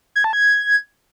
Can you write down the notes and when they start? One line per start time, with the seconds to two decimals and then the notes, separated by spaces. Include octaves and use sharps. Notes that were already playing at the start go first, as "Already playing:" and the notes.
0.16 G#6
0.24 A5
0.33 G#6